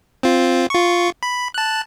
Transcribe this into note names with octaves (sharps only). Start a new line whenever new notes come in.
C4 F4
F4 C#6
B5
A5 F#6